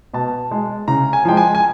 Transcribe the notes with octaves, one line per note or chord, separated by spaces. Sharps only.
B2 A5
G#3
C#3 A#5
G#5
F3 G#3 G5
G#5
G#5